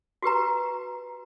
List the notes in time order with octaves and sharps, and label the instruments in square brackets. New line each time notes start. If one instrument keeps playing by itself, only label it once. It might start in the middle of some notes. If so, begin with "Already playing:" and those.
[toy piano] F#4 G4 B4 A#5